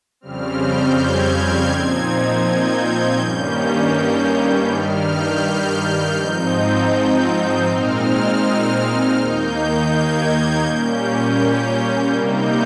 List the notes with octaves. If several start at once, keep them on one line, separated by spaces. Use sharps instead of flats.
F2 C#3 G3 C4 F6
G6
G#6
A#2 F3 C4 D#4
G6
G2 D#3 G3 A#3 C#4 G6
G2 D#3 G3 F6
G6
G6
G#2 F3 C4 D#4
G6
A#2 G#3 C4 D#4 F6
D#2 D#3 A#3 D#4 G6
G#6
A#2 G3 A#3 C#4 G6
C3 G3 A#3 D#4 G6